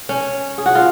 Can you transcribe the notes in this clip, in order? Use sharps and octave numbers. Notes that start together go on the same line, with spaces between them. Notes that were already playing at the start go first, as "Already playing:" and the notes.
C#4
G#4
F#4
F4